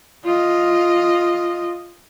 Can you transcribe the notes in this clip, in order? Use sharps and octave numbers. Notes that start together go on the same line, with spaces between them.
F4 D#5